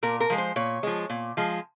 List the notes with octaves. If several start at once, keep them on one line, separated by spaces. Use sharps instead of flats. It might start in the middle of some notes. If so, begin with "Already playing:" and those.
A#2 A#4
A#4
F3 G#3
C5
A#2 C#5
F3 G#3
A#2
F3 G#3